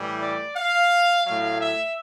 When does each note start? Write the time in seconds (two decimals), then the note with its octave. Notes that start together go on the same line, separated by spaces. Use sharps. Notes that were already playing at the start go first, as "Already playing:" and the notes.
Already playing: A2 E3 G3
0.22 D5
0.56 F5
1.25 A2 F#3 F5
1.60 E5